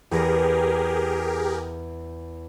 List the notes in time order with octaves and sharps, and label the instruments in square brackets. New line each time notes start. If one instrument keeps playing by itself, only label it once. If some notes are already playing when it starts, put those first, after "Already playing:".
[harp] E2 A#5 [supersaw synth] G4 G#4 A#4